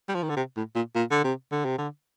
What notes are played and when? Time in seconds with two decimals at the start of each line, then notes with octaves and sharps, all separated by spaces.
0.08 G3
0.15 F3
0.23 D#3
0.29 D3
0.36 C3
0.57 A2
0.75 A#2
0.95 A#2
1.11 D3
1.24 C3
1.52 D3
1.65 C3
1.78 D3